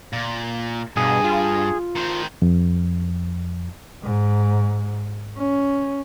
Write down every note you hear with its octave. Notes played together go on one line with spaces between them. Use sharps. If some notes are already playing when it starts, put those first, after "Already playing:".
A#2
G2 B2 G#4
F4
D#3 C5
F2
G#2
C#4